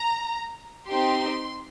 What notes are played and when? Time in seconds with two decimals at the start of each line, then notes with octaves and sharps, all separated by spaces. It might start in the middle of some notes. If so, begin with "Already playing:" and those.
Already playing: A#5
0.89 C4 D#4 G4 C6